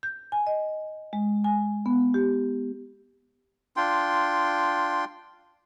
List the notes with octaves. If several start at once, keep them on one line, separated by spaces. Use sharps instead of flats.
G6
G#5
D#5
G#3
G#5
B3
G4
D4 F4 G5 C6